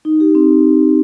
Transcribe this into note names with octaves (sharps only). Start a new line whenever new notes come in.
D#4
G4
C4